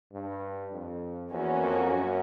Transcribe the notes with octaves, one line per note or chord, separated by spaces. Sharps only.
G2
F2
E2 A#3 C#4 F#4
F2
F#2